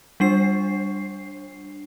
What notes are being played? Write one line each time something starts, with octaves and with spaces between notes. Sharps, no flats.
G3 D4 C7